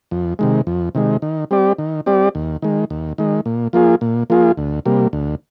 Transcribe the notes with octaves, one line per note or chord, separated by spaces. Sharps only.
F2
C3 D#3 G#3
F2
C3 D#3 G#3
D#3
G3 C4 G4 D5
D#3
G3 C4 G4 D5
D#2
D#3 G#3
D#2
D#3 G#3
A#2
F3 A#3 F4 G#4
A#2
F3 A#3 F4 G#4
D2
C3 G3 A#3
D2